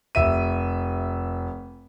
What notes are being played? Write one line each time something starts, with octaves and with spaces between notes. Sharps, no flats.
F1 E5 D#7